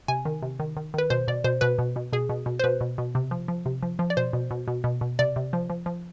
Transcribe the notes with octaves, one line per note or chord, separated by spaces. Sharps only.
C3 G#5
D#3
C3
D#3
D#3
D#3 B4
B2 C5
B2 D5
B2 C5
B2 B4
B2
B2
B2 G#4
B2
B2
C5
B2 B4
B2
B2
C3
F3
F3
C3
F3
F3
D5
B2 C5
B2
B2
B2
B2
B2
C3 D5
C3
F3
F3
F3